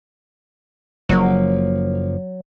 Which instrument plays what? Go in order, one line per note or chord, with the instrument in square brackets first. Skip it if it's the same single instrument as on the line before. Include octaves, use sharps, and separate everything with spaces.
[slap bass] F#1 F3 A#3 [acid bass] F#3